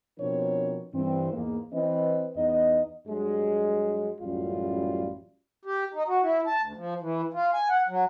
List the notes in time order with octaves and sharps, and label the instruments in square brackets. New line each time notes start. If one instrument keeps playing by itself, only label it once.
[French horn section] B2 F3 C4 D4 A#4 C#5
G2 E3 C4
E2 G#2 G#3 A#3
E3 C4 B4 D#5
E2 B3 D#4 D#5
[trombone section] G2 F#3 G#3
A1 F#2 G3 F4
[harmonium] G4
D#4
F#4
E4
A5
D2
F3
E3
F4
G#5
F#5
F#3